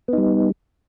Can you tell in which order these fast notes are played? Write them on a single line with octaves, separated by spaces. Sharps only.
B3 D#4 G3